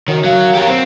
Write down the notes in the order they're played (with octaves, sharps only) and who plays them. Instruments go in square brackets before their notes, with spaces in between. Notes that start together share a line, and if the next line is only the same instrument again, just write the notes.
[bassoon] F#2 [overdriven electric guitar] D#3
[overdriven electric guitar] F#3 [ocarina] F5
[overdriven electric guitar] G4 A#4
[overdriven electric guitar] C4 [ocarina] C5